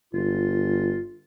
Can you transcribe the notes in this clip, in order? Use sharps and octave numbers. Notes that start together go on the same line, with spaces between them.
G1 F4